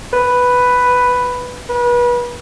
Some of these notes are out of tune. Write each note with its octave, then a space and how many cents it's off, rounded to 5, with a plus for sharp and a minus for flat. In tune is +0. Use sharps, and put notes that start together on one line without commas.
B4 +5
B4 -30